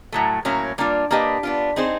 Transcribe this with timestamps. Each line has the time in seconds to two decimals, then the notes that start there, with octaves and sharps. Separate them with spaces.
0.12 A2 F#3 A3
0.45 A2 F#3 A#3 C#4
0.78 G3 A#3 D4 F4
1.11 A#3 D4 G4 B4 D#5
1.43 B3 D4 F4
1.76 C4 D#4 G#4 C5